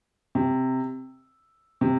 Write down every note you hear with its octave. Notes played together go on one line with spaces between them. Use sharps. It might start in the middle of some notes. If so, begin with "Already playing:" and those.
C3
C3